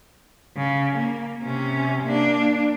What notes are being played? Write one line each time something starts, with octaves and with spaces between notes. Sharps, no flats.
C#3
A#3
C3 C#4
A#3 D4